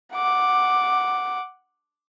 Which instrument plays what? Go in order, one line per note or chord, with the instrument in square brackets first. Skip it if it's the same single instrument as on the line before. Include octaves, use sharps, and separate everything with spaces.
[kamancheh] F#5 D6